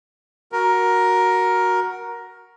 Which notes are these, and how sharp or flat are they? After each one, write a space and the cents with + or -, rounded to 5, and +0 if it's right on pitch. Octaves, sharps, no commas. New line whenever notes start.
F#4 +0 A#4 +10